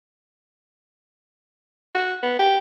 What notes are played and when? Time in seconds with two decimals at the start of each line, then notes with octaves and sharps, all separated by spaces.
1.95 F#4
2.23 B3
2.39 G4